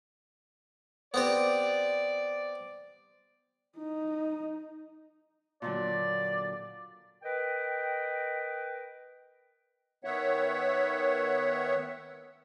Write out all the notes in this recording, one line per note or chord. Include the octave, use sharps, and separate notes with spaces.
B3 C4 G4 D5
D#4
A#2 D3 F#3 D5
A#4 B4 D#5 G5
D#3 B3 C#5 E5 F#5